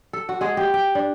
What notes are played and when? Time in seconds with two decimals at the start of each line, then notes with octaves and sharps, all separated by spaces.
0.13 A4
0.29 F#4
0.41 G#3 F#4 G#4
0.57 G4
0.74 G5
0.95 D4